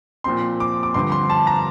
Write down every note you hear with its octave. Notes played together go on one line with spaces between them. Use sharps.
A#2 F3 C4 C6
D6
D6
G2 D3 F3 C4 C6
C6
A5
A#5